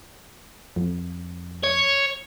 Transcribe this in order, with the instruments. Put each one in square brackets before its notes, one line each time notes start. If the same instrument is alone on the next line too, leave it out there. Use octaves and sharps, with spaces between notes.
[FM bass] F2
[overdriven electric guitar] C#5